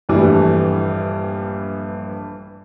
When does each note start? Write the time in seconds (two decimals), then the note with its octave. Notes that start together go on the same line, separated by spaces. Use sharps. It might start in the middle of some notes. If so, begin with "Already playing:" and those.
0.09 A#1 G2 E3 G3 A3